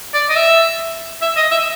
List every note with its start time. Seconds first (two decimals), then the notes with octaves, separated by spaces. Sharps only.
0.14 D5
0.29 D#5
0.36 E5
1.22 E5
1.37 D#5
1.51 E5